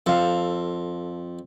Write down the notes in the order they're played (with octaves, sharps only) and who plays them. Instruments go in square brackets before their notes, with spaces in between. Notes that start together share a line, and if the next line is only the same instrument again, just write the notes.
[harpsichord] F2 [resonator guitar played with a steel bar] A4 F5